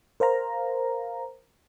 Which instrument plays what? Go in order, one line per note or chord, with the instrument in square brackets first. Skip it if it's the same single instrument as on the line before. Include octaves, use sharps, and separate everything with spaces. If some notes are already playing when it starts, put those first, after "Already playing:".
[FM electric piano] A#4 C5 F5 A#5